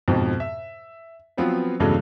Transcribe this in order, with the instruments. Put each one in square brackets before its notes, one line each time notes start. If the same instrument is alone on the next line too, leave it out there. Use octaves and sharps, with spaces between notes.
[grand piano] F2 G#2 B2 F3
E5
F3 F#3 B3 C4 F4 B4
E2 G2 C#3 F#3 G#3 A3